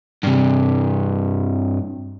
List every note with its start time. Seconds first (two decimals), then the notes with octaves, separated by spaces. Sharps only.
0.24 G2 C3